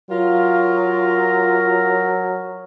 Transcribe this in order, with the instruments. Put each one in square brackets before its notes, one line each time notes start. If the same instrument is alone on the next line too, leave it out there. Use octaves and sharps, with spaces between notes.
[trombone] F#3 [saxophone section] F4 [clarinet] A#4